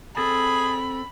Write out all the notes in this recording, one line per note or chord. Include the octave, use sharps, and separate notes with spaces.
C4 G#4 A4 A5 B5